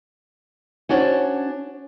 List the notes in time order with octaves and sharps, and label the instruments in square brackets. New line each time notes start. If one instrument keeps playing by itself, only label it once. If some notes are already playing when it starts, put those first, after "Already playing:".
[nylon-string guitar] C#4 D4 F#4 C5 C#5